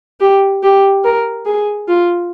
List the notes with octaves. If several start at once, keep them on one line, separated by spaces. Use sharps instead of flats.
G4
G4
A#4
G#4
F4